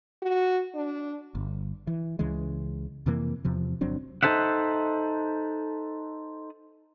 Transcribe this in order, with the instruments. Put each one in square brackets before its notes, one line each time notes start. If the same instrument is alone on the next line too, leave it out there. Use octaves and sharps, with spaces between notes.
[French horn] F#4
D4
[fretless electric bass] G1
E3
C#2 C#3 E3 G#3
F2 C3 E3 A#3
E2 C3 F3
G1 F#3 C4 D4
[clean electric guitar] D#4 F4 A4 C5 E5 F#5